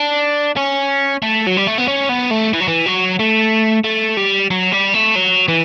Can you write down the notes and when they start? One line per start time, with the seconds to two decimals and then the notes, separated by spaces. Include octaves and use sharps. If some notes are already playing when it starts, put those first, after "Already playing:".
Already playing: D4
0.57 C#4
1.22 A3
1.47 F#3
1.57 G3
1.67 A3
1.78 B3
1.88 C#4
2.09 B3
2.31 A3
2.54 E3
2.61 F#3
2.68 E3
2.86 F#3
3.19 A3
3.84 A3
4.17 G3
4.51 F#3
4.72 G3
4.94 A3
5.15 F#3
5.48 E3